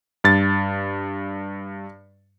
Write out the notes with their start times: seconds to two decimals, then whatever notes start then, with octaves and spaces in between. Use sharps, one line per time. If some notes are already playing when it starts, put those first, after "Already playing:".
0.24 G2 A6